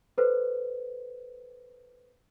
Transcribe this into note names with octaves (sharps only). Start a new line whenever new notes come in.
A4 B4 C5